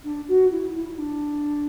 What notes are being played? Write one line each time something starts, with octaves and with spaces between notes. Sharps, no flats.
D4
F#4
E4
E4
E4
D4